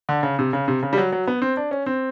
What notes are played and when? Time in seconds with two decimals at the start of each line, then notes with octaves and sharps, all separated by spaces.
0.09 D3
0.23 C#3
0.39 C3
0.53 C#3
0.68 C3
0.83 C#3
0.93 G3
0.98 F#3
1.12 F#3
1.27 B3
1.42 C4
1.57 D4
1.71 C#4
1.86 C4